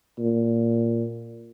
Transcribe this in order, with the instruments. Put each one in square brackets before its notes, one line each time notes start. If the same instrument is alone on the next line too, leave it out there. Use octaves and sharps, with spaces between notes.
[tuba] A#2